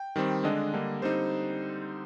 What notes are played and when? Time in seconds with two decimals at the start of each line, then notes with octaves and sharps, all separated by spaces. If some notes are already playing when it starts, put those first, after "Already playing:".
Already playing: G5
0.16 D#3 G3 C4
0.44 D3 G#3 D4 D#5
0.73 D3 G3 A#3
1.02 D3 G3 C4 D#4 C5